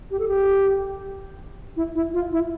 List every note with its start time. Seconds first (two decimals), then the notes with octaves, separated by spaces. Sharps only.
0.11 G4
0.19 A4
0.28 G4
1.77 E4
1.95 E4
2.14 F4
2.32 E4